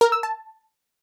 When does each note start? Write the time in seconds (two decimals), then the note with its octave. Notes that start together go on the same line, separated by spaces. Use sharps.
0.01 A#4
0.12 E6
0.23 A5